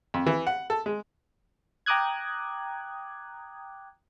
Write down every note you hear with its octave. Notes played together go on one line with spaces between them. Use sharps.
F2
E3
F#5
A4
G#3
G5 A#5 D6 D#6 F#6 G#6